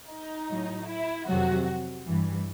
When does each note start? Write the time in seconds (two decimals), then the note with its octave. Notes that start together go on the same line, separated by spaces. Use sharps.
0.08 D#4
0.48 A2 F#3
0.87 E4
1.26 F2 C3 D#3 F#3 F#4
2.06 G2 E3